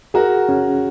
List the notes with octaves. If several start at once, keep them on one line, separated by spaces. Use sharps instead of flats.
F#4 G#4 A#4
C#4